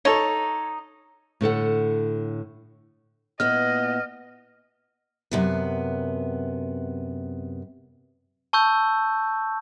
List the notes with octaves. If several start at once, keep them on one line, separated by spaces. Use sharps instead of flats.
D#4 A4 C#5
A2 D3 A4 F#5
A#2 B3 E4 D#5 F6
F#2 C3 B3
A5 C#6 E6 G6